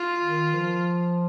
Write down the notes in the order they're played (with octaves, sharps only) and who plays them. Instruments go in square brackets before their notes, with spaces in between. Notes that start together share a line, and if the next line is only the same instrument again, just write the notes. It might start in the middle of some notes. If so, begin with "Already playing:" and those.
Already playing: [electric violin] F4
[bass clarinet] D#3
F3